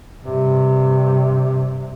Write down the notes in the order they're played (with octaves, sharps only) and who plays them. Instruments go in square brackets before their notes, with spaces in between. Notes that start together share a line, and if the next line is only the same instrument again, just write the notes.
[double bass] G2 [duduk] C3